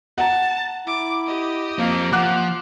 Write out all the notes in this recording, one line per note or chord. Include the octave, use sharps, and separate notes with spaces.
F#5 A5 A#5
E4 D6
G4 D#5
F3 A#3 C4
F3 F#5 D6 F#6